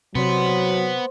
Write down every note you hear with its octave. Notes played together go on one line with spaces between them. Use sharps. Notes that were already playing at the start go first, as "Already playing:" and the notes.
C3 F#3 B3 C5 D5 C6